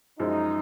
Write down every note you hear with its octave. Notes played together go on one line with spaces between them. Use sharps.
F#2 F3 G#3 D#4